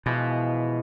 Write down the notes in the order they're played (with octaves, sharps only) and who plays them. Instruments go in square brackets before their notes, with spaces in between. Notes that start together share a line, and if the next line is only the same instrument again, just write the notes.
[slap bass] B2 [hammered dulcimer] E3 F3 G#3